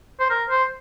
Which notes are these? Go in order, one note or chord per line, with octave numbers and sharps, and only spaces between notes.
C5
A#4
C5